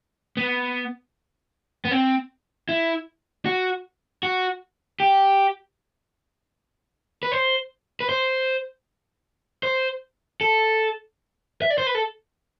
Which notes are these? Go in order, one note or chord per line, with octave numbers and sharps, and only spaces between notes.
B3
B3
C4
E4
F#4
F#4
G4
B4
C5
B4
C5
C5
A4
E5
D5
C5
B4
A4